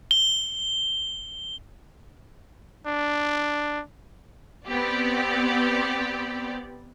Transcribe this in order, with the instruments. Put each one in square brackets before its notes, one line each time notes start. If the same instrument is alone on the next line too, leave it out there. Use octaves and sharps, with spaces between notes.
[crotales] G7
[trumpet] D4
[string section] B3 C4 G4 D5